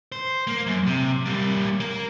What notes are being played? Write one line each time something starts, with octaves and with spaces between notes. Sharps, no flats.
C5
A#3
F#2
C3
G3 A#3
A#3 A#4